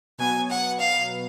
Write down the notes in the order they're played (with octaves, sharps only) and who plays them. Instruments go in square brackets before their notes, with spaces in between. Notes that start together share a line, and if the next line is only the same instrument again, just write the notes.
[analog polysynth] B2 F#3 B3 [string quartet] G#5
[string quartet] F#5
F5